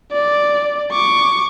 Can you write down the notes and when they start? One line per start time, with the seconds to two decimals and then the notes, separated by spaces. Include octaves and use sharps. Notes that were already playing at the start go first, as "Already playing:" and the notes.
0.12 D5
0.92 C#6 D6